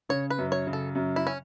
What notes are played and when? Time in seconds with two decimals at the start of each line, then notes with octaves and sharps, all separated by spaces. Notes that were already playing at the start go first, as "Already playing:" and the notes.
0.09 C#3 C#5
0.30 B4
0.38 F#2
0.52 C#5
0.67 C#3
0.73 A4
0.95 F#2
1.16 E4
1.27 C#4